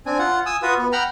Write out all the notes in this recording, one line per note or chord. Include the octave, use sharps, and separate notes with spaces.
C4 D4 G#5
F4 F#5
G#5 D#6 E6
F4 F#4 B4 D#6
B3
F#5 G5 A#5 B5 F6